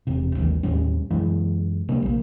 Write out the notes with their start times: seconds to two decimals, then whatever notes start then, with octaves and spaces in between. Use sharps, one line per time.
0.07 E1 C3
0.35 G#1 D#2 E3
0.63 D#2 A2 G3 C#4
1.10 F#2 E3 G#3
1.89 C3 G3 A#3 C4
2.03 A#1 A#3